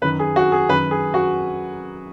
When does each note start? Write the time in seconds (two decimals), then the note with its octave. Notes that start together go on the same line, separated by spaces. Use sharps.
0.02 F#2 D#3 B4
0.19 G#4
0.36 F#4
0.52 G#4
0.69 F#2 D#3 B4
0.91 G#4
1.14 F#4